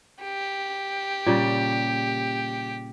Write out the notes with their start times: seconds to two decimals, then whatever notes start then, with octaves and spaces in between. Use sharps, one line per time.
0.23 G4
1.26 A#2 C#3 G3